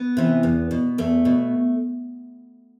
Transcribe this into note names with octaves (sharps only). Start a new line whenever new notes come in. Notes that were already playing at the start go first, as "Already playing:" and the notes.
Already playing: B3
C3 E3
E2
B2
E2 A3
B2